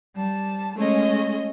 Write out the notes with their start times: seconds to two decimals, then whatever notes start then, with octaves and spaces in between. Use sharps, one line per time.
0.16 G3 A5
0.75 G#3 A3 C#4 D#5